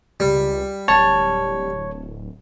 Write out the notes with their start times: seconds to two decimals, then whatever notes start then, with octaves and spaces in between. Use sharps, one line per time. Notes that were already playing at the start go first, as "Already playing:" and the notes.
0.20 C#2 G3
0.88 D1 C#5 A5